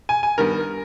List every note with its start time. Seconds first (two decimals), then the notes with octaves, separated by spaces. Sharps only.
0.09 G#5
0.23 G#5
0.38 G2 D#3 G3 B3 A#4